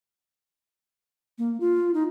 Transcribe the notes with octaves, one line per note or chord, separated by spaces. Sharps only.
A#3
F4
D#4